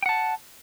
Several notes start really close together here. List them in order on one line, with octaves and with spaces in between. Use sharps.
G5 F#5 A5